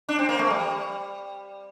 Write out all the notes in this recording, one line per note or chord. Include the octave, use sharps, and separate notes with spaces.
D4
C4
A#3
A3
G3